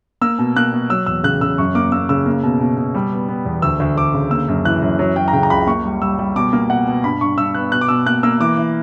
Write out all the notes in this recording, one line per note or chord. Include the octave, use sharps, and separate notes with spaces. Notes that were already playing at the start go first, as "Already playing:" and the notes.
A#3 E6
B2
A#3 F#6
B2
F#3 E6
E2 E6
C#3 F#6
C#3 E6
F#2 C#6
A#3 D6
A#3 E6
C#3 E6
A#3
B2
B2
B2
G3
B3
B3
E2
D2 E6
D2
D2 D6
C#3
A#3 E6
F#2
E3 F#6
F#2
F#3
F#3 G5
A#5
C#3 G5
A#5
C#2 B5
A#3 C#6
G3
G3 E6
G3
B2 D6
A#3
B2 F#5
B2
G2 B5
G2 C#6
G2 E6
B3 F#6
B2 F#6
D6
B2 E6
A#3 F#6
A#3 E6
E3 D6
E3